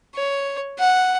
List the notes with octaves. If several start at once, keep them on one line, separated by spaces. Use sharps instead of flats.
C#5
F#5